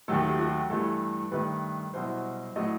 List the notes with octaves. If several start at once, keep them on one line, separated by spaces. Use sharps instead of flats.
D#2 D#3 F#3 A3 A4
G4
F#4
G2 E3 A3 A4
G2 D#3 A3 B4
C2 B2 F#3 C5
A2 F#3 A3 D#5